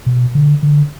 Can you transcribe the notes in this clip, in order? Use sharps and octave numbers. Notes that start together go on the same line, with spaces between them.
B2
D3
D3